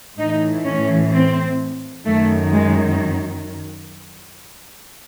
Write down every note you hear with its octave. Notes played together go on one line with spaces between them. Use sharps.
A2 E3 D#4
C#4
C4
F#2 D#3 A3
G#3